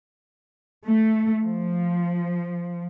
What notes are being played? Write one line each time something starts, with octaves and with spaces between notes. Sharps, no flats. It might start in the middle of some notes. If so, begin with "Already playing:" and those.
A3
F3